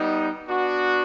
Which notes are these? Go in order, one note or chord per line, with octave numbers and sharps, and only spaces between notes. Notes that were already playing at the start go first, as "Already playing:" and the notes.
Already playing: G3 B3 D#4
B3 D4 F#4